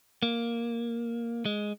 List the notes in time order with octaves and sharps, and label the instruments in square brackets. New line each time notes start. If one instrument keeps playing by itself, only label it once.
[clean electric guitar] A#3
G#3